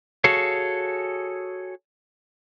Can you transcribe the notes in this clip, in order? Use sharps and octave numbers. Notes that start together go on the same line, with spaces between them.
F#4 G#4 A4 C#5 F5